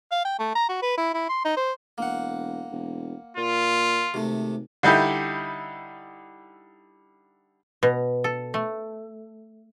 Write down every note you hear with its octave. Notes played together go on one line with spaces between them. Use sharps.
F5
G5
A3
A#5
F#4
B4
E4
E4
C6
D#4
C5
E1 A#3 F#5
E1
A#2 F4
G#1 C3 A3
D3 G3 D#4 E4 G4
B2
A4
A3